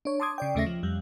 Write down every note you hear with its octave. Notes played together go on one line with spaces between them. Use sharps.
D4 C#5
A5 C6 D6 D#6 G#6
C#3 D5 G5
D#2 C#3 A3 C#4 E5 A#6
F3
F2 G3